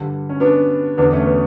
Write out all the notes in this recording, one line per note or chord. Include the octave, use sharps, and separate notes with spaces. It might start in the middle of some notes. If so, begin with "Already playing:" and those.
Already playing: G2 D3
C#4
B3 D4
E2 D3 B3 D4
A3 C#4
B3